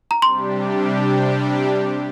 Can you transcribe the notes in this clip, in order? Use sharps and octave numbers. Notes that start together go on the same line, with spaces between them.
A#5
C3 G3 D4 G4 C6